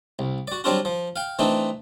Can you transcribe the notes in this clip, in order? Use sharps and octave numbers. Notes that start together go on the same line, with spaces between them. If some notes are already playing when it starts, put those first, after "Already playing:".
C2
F#4 D5
F#3 G3 C4 D4 F4 F#4
F3
F5 G5
E3 A3 C4 D4 D#4